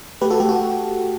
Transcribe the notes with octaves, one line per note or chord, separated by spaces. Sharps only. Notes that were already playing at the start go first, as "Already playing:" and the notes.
A3 G4 B4
F#4 A4
A3 G4
F#4